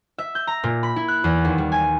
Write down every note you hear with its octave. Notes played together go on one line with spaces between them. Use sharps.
E5
G6
A#5
A#2
B5
E4
F#6
E2
D#2
G3
G#5